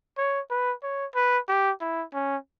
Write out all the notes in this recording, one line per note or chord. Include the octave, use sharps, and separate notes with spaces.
C#5
B4
C#5
B4
G4
E4
C#4